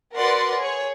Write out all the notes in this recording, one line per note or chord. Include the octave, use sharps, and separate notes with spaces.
F#4 A#4 B4 D5 F#5 C6
G#4 C#5